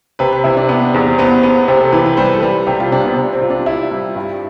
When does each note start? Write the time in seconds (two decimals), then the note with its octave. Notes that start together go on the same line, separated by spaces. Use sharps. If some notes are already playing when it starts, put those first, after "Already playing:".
0.19 C3 B4
0.33 B4
0.44 C3 E4
0.57 D4
0.69 B3
0.94 E2
1.18 B3 C4
1.43 B3
1.68 C3 C4
1.80 A4
1.92 E3 B4
2.06 B4
2.17 G3 C5
2.25 B4
2.33 A4
2.40 G3 B4
2.67 C3 G4
2.80 F4
2.92 C3 D4
3.04 B3
3.17 C3
3.33 C4
3.41 F4
3.50 D4
3.66 E4 F4
3.91 G3
4.16 G2